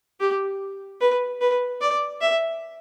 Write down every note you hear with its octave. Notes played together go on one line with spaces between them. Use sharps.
G4
B4
B4
D5
E5